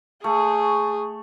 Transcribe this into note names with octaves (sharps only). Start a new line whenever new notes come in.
A3 G#4